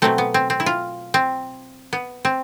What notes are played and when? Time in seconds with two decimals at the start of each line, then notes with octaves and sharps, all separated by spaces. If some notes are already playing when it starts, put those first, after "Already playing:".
0.02 B2 F#3 A3 C4
0.18 B3
0.34 C4
0.50 C4
0.60 E4
0.66 F4
1.14 C4
1.93 B3
2.25 C4